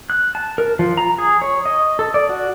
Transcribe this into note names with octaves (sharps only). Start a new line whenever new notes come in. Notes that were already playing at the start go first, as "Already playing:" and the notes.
F#6
A5
A#4
F3
A#5
G#4
C#5
D#5
A4
D5
F#4